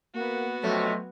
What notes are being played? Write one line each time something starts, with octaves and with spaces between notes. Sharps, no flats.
A#3 B3 F#4
F2 C3 F#3 A3 C#4